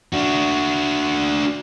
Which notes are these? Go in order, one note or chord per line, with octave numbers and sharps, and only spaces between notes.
D4 F#4